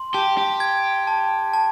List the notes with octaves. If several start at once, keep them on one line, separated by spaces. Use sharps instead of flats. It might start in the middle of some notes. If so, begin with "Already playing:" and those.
Already playing: C6
G4 A5
G4
G#6
A5
A5